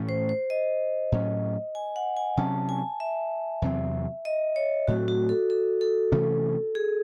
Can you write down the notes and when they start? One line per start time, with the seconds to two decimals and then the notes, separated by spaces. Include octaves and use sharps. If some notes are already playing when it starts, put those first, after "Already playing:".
Already playing: A2 E3 A3 C#4
0.09 C5
0.29 C5
0.50 D#5
1.12 A2 F#3 C#4
1.75 G#5
1.96 F#5
2.17 G#5
2.37 C3 F#3 C#4 A5
2.69 G#5
3.00 E5
3.62 E2 C3 F#3 C4
4.25 D#5
4.56 C#5
4.88 A2 F#3 A3 C4 F#4
5.08 F#4
5.29 A4
5.50 A4
5.81 A4
6.12 C3 E3 A3 C#4
6.75 G#4